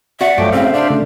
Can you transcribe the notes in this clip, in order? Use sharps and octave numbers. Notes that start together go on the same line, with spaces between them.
F#4 D5 E5 F#5
G2 F3 F#3 A3 F#4 G5 D6
A2 C#3 C4 C5 E5 F5
D4 D5
C#3 A3